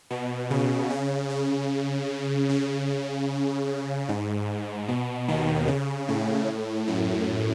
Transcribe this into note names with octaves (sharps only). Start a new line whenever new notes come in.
B2
C#3
C#3
C#3
C#3
G#2
B2
D#2 D#3
C#3
A2
F#2